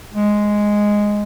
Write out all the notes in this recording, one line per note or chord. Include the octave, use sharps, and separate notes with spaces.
G#3